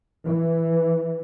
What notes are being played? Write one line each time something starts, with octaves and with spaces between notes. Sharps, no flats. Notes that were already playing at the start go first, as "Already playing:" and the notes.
E3